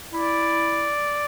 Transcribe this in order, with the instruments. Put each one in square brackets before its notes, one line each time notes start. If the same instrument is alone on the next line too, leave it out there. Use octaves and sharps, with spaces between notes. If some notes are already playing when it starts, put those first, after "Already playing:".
[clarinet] E4 [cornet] D5